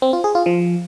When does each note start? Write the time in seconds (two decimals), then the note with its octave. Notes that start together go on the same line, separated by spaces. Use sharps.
0.02 C4
0.13 F4
0.24 G#4
0.35 F4
0.46 F3